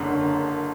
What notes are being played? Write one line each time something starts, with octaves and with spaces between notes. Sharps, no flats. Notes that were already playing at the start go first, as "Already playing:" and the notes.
Already playing: F#1 F#2 D3